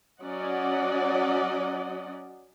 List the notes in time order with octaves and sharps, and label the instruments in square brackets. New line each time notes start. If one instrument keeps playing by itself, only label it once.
[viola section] F#3 C#4 D5 D#5 F#5